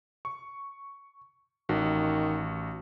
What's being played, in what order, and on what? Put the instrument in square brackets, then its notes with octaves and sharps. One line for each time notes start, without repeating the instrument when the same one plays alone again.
[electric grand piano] C#6
[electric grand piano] A1 F#4 [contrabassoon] D#3